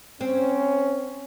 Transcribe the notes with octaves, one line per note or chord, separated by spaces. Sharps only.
C4 C#4